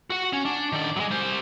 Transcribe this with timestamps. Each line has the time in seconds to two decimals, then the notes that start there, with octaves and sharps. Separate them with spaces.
0.10 F#4 F#5
0.33 C#4
0.45 D4
0.72 D#3 D5
0.96 F#3 G#3
1.11 G3 C5